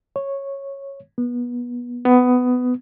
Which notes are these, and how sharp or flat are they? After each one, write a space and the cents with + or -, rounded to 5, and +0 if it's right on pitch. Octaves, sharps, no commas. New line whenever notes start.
C#5 -10
B3 -25
B3 +15